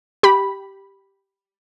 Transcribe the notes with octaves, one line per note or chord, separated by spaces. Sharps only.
G4 B5